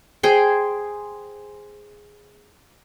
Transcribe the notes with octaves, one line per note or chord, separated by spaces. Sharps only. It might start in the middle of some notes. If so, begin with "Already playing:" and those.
G#4 C5 G5